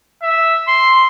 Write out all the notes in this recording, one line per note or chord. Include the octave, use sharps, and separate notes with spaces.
E5
C6